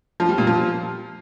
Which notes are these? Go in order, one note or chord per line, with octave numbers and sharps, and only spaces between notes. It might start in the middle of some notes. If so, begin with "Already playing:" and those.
F3
G3
A#2
F3